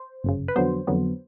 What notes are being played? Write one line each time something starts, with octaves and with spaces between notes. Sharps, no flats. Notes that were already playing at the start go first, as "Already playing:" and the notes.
Already playing: C5
G1 F#2 C#3
B4
F2 D3 F#3 B3 C5
F2 D3 F#3 B3